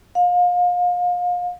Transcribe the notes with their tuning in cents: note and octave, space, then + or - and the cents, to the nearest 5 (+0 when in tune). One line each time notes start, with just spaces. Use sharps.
F5 +30